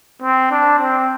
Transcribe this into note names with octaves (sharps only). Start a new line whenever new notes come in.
C4
D4
C4